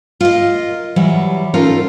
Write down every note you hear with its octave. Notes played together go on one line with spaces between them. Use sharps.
F4 A#4 D#5
E3 F#3 G3
C#4 D#4 F4 A4 A#4